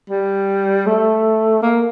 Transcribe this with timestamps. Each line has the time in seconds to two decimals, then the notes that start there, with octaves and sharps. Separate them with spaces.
0.10 G3
0.87 A3
1.62 A#3